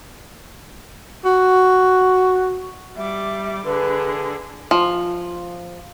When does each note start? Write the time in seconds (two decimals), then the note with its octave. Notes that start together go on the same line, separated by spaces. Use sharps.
1.25 F#4
2.97 G3 E5 D6
3.65 D3 G#4 B4
4.71 F3